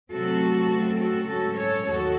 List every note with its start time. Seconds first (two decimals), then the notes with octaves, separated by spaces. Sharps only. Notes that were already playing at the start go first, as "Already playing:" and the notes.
0.11 C3 F#3 A3 C4 F#4 A4
0.70 C#3 F#3 A3 C4
0.99 F#4 A4
1.28 G#2 F#3 A3 C#4 F#4 A4
1.58 A4 C#5
1.86 D#2 D#3 F#3 F#4 A4